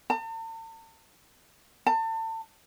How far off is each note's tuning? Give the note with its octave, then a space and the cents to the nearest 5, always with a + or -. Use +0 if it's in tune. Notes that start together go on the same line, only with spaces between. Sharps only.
A5 +45
A5 +35